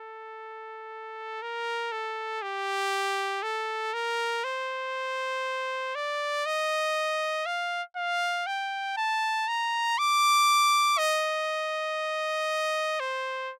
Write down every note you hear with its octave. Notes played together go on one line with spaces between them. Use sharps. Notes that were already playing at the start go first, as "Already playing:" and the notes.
Already playing: A4
A#4
A4
G4
A4
A#4
C5
D5
D#5
F5
F5
G5
A5
A#5
D6
D#5
C5